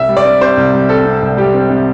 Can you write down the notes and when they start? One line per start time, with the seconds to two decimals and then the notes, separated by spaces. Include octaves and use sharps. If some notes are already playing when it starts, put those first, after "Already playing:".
Already playing: C2 E5
0.09 G3
0.17 D5
0.25 C4
0.41 C3 C5
0.57 C2
0.73 G3
0.89 C4 A4
1.05 C3
1.22 C2
1.37 G3 G4
1.54 C4
1.70 C3